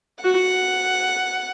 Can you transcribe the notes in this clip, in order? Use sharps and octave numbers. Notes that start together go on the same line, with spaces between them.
F#4 F#5